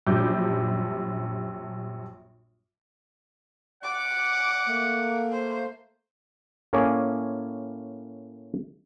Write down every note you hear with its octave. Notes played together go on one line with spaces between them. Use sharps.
A#1 F#2 G3 D4 D6 G6
D5 F#5 D6
A3 A#3
C5
A2 A#3 C#4 G#4 D5 G#5